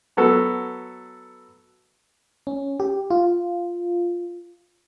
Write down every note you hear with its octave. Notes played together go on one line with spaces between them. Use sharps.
F#3 B3 F#4 A4
C#4
G4
F4